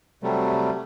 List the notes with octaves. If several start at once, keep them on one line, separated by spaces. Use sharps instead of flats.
C3 F#3 G3 A3